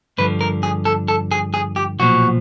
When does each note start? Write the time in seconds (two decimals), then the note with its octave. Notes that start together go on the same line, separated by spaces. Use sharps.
0.18 G2 D3 F3 B4
0.41 A#4
0.63 G#4
0.85 A4
1.08 A4
1.32 G#4
1.54 G#4
1.76 G4
1.99 B1 A#2 F3 F#4